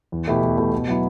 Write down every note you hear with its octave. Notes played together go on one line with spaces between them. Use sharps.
E2
B2 A3 E4 G4
E2
B2 A3 E4 G4
B2
F#3 B3 E4